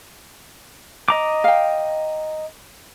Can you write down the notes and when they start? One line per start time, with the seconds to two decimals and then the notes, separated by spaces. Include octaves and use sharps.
1.08 D#5 A#5 D6
1.44 F5 G5